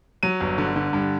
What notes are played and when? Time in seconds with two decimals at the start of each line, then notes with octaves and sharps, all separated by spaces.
0.23 F#3 D#7
0.41 G1
0.58 D3
0.76 D3
0.93 G2